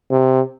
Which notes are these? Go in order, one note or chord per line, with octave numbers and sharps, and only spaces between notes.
C3